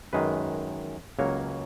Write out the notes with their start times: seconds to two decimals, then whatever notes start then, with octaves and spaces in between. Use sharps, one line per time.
0.13 F#2 D#3 G#3 B4
1.19 C#2 C#3 F#3 A#3 C#5